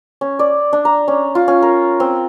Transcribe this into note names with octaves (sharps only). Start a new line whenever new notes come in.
C#4
D5
D4
A#5
C#4
F4
C#4
A#4
C4